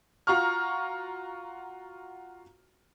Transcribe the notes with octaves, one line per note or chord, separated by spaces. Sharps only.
F4 F#4 A#5 C#6 F6